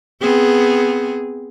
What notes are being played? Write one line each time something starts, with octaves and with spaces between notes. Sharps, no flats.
B3 C4 G#4